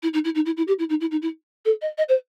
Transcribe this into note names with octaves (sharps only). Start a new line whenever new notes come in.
E4
D#4
E4
D#4
E4
E4
G4
E4
D#4
E4
D#4
E4
A4
D#5
D#5
C5